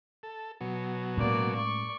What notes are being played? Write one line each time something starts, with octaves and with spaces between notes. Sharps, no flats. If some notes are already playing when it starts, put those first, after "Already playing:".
A4
B2 F#3
A2 G#3 A#3 C#4 D5
D5 C#6